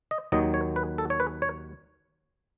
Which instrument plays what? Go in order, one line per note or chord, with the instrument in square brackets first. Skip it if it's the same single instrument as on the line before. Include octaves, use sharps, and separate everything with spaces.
[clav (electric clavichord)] D#5
D#2 D#3 F#3 D#5
C#5
B4
A4
C#5
B4
C#5